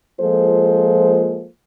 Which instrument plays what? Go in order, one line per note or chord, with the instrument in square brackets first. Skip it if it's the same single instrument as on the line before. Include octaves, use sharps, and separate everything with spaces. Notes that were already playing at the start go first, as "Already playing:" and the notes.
[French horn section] F3 G#3 A#3 F4 A4 C5